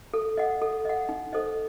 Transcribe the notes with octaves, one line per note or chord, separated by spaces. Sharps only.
A4
D#5 F#5
A4
D#5 F#5
D#4
A4 C5 D#5